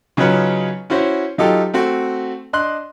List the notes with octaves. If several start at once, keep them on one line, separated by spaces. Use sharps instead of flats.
C#3 F#3 D#4 F4 B4 C#5
C#4 E4 F#4 C5 C#5
F#3 D#4 F4 G4 A4
A3 C4 F#4
D4 D#5 C6 F#6